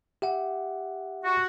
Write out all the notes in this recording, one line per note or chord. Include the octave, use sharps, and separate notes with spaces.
G4 E5 F#5
F#4